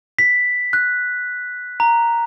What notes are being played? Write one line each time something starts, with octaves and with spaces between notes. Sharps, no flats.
B6
F#6
A#5